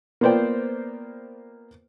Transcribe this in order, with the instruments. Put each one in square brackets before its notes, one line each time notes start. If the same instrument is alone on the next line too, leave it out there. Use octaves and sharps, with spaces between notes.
[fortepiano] A#3 B3 F4 C5 D5 G5